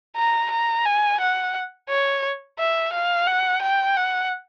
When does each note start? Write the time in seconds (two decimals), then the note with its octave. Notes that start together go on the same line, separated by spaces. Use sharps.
0.16 A#5
0.51 A#5
0.85 G#5
1.20 F#5
1.89 C#5
2.59 E5
2.93 F5
3.27 F#5
3.62 G5
3.97 F#5